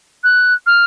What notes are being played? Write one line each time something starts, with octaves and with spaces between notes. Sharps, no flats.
F#6
F6